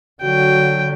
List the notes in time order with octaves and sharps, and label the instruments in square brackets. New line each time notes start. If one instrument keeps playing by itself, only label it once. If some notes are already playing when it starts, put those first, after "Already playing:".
[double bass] D3 F#3 [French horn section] F#4 [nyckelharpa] G5